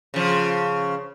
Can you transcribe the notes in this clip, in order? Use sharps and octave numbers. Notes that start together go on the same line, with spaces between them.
C#3 F3